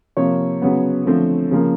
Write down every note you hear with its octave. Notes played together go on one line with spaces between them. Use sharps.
C3 F3 A#3 C#5
C#3 F#3 B3
D3 F3 A3 C4
C#3 F3 A#3